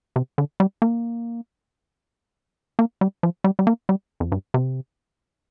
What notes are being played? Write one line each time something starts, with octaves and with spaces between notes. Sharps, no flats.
C3
D3
G3
A#3
A#3
G3
F3
G3
G3
A#3
G3
F2
G2
C3